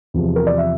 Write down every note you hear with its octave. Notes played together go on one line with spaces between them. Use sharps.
E2 C3 F3
A#4
D5
E5